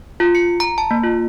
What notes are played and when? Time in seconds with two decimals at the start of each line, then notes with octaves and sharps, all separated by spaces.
0.20 F4
0.35 C#7
0.60 A#5
0.78 A5
0.91 A#3
1.03 F4